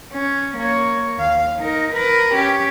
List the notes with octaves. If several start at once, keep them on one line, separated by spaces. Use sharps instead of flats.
C#4
A#3 C#5
D#2 F5
D#4 A#4
A#4 B4
C#4 G4